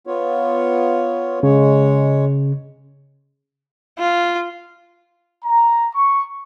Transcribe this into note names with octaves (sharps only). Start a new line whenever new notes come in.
B3 F4 C#5
C#3 G#3 C#5
F4
A#5
C#6